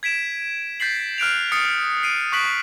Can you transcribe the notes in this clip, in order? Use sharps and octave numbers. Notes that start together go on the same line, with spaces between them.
G#6 B6 D7 E7
G6 A6 B6 C7 F#7
F6 F#6 D7 F7
D#6 A6 C7 C#7
C7 D7 D#7
C#6 D#6 F#6 B6 D7 F#7